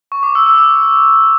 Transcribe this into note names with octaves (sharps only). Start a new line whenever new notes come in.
C#6
D6
E6
E6
E6